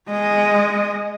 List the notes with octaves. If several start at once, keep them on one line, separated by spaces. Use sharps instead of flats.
G#3 D#5